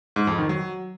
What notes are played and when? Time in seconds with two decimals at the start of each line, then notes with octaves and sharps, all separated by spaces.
0.16 G#2
0.27 F2
0.38 D#3
0.49 F#3